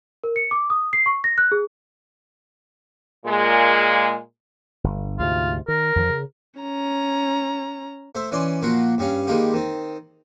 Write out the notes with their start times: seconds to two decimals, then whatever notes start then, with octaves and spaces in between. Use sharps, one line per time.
0.24 A#4
0.36 C#7
0.51 D6
0.70 D#6
0.93 C7
1.06 C#6
1.24 A#6
1.38 F#6
1.52 G#4
3.26 A#2 G#3
4.84 G1
5.19 D2 G#2 C3 F4
5.68 D#3 A#4
5.96 F2 D#3 F3
6.09 C#3
6.60 C#4 A#5
8.15 A3 C5 E5
8.31 E3 C#4 D5 C6
8.62 A#2 F3 A#3 F4 F#4
8.98 G2 G3 C#4 F5
9.27 D#3 G3 G#3 A#3 F4 G4
9.54 D#3 C4